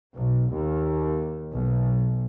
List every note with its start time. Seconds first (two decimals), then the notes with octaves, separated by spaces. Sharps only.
0.16 B1
0.53 D#2
1.54 B1